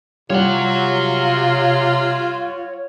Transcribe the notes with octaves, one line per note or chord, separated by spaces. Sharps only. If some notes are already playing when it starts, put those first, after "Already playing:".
C3 G3 F4 C#5 F#5